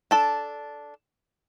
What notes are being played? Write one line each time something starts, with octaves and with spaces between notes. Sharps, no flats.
D4 A4 A5